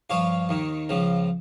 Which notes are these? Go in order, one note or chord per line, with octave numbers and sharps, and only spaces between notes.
G2 F3 C#5 F5
D#2 D#3
C#2 C#3 F3